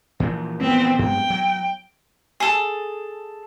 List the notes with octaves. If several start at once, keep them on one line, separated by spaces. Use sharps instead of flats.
A#2 E3 F3
B3 C4
G2 F#3 G#3 G5
F#3
G#4 A4